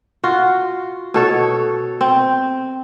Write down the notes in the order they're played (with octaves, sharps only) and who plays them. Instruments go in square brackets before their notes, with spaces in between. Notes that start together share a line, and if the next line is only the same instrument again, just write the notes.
[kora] F4 F#4
B2 A4 C#5
C4